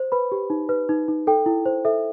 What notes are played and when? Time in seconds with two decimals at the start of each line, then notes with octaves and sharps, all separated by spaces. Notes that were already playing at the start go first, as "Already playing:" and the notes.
Already playing: C5
0.12 B4 B5
0.32 G4
0.50 D#4
0.69 B4
0.89 D#4
1.08 D#4
1.27 A4 G5
1.46 E4
1.66 C5
1.85 A4 E5